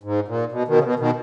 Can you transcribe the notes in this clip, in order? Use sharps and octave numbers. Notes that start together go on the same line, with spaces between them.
G#2
A#2
B2
B2 D#3
C#3
B2
B2 D#3